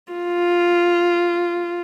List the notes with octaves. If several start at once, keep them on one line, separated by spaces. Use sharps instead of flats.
F4